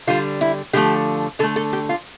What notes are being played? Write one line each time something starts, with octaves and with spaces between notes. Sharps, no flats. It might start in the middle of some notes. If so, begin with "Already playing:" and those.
D3 G3 F4
E4
D3 F3 A3 G4
D3 A3 A4
A4
G4
F4